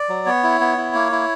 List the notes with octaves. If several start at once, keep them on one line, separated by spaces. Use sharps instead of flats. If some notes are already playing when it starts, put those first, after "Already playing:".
Already playing: D5
F#3
B3 C#5
E4
B3
E4
A#3
E4